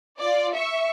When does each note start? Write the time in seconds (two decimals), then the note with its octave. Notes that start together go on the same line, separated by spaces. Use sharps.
0.20 F4 D5
0.55 E5 C#6